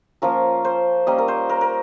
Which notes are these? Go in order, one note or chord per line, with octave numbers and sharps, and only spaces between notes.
F3 A#3 C#4 F4 A#4
C5
G3 A#3 C#4 D#5
A#4
C5
A#4
A#4